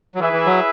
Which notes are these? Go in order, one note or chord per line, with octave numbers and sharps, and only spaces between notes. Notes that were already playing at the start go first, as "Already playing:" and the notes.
F#3
E3 E4 G#4 B4 E5
E3
F#3